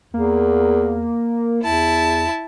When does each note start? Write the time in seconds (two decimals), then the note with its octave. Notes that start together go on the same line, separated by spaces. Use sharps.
0.14 E2 A#3
1.63 E2 E4 A5